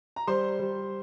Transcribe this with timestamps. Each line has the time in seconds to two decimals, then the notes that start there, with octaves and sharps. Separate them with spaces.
0.16 A#5
0.27 G3 C5 C6
0.59 G3